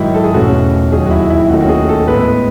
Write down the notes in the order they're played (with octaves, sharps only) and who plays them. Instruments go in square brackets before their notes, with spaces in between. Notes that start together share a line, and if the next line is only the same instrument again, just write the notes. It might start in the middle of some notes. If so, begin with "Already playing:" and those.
Already playing: [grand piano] G#2 D#3 F#3 E4
A4
G#4
E2 B2 A3 C#4 F#4
D#2 D#3 F#3 G#4
F#4
E4
E4
E4
D#2 D#3 A3 C#4 F#4
F#4
G#4
A4
A2 G#3 B3 B4